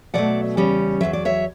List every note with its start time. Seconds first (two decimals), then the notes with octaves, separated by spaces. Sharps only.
0.14 B2 F#3 A3 D5 F#5
0.57 E2 C#3 G3 C#4
1.01 E2 C#3 F#3 E5
1.13 D5
1.25 C#5 E5